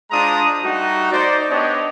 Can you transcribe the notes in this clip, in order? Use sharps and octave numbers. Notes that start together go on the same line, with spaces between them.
G#3 D4 F4 C5 A#5 D#6
G3 A3 D#4 F#4
D#4 C5 D5
B3 D4 G4 C#5 D#5